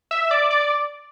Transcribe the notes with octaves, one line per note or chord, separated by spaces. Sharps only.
E5
D5
D5